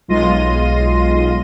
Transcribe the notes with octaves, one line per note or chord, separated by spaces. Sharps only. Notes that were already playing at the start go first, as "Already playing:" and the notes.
B1 G#3 F4 C6 A#6 D#7